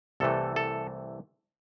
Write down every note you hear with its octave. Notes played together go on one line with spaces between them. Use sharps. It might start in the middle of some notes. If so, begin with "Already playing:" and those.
C2 C3 E3 A3 A4
A4